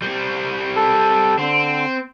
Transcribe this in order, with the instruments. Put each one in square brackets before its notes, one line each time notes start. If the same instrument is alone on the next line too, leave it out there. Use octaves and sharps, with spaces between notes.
[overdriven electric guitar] G3 C4
[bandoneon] A4
[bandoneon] D3 [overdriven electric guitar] C4